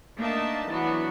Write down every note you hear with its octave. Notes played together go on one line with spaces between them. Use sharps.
A3 A#3 D4 D#4 E5 A5
E3 F#3 B3 D4 F#4